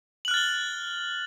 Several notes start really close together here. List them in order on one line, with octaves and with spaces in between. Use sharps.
F#7 F#6 F6 A6 G7